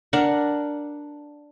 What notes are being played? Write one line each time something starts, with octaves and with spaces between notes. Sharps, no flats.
D4 A#4 F#5